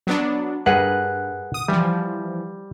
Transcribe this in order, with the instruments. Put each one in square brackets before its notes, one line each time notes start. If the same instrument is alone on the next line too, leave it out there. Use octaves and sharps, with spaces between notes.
[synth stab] F#3 B3 D4
[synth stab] G2 [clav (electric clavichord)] G#4 A#4 B4 [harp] F#5
[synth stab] D#6
[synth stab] E3 F3 [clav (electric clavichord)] G3